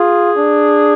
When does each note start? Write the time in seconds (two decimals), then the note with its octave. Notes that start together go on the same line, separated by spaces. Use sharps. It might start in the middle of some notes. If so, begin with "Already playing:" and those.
Already playing: F4 G#4
0.37 D4